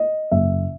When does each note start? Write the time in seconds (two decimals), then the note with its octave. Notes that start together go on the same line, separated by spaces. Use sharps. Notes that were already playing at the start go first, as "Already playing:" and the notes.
Already playing: D#5
0.31 F#1 E5